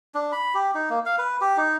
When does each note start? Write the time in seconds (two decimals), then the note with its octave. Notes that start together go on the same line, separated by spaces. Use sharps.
0.14 D4
0.32 B5
0.54 G4
0.75 D#4
0.90 A#3
1.06 F5
1.18 B4
1.41 G4
1.57 D#4